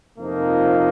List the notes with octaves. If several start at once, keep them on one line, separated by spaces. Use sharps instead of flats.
F2 C3 F3 A#3 D#4